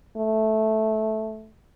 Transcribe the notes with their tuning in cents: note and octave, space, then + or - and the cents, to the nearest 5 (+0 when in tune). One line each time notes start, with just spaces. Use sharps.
A3 -10